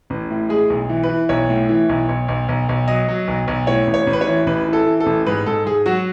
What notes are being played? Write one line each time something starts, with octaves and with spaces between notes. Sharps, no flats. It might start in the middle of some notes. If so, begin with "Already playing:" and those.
A1
A2
G#3 G#4
B1
E3
B4
E3
B1 C#5
A2
E3
B1
B1
B1
B1
B1
F#3 D#5
F#3
B1
B1
A2 C#5
A1
C#5
A1
B4
C#5
E3
A1 B4
E3
A4
E3
A4
A1
G#2 B4
G#2 A4
G#2 G#4
F#3 F#4